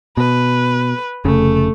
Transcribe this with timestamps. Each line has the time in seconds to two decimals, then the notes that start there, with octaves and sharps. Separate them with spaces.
0.17 B2 B4
1.25 F1 C#3 A3